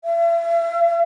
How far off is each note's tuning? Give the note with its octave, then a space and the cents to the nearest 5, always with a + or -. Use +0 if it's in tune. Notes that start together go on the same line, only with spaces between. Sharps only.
E5 +40